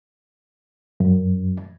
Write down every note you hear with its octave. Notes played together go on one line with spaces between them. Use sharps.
F#2